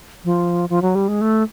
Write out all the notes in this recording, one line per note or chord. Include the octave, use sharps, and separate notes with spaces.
F3
F3
F#3
G3
G#3
A3